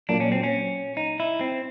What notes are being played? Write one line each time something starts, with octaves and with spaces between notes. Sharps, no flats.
A#2 F#3 A#3 D4
C#4
C4
C#4
D#4
E4
C4